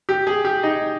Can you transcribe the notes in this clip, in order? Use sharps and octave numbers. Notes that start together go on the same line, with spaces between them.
G4
G#4
G4
D#4